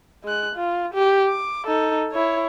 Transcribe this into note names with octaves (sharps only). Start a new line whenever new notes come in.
G#3 F#6
F4
G4
D6
D#4 A4
E4 C#5